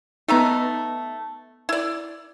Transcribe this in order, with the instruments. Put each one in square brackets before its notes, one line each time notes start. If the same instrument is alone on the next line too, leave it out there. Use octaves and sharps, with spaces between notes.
[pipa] A3 E5 A#5 [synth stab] B3 D#4
[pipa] E4 D5